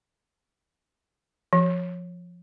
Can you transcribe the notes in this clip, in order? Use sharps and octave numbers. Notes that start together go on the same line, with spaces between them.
F3